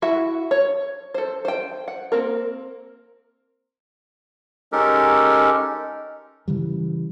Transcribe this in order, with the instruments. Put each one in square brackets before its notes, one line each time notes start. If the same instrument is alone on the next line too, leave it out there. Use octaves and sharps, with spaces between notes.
[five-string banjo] E4 F#4 E5 F#5
C#5
A4 C5
C5 G5
F#5
A#3 C4 A#4
[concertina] G#3 C#4 D#4 G4 A4 A#4
[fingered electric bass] C#3 E3 G3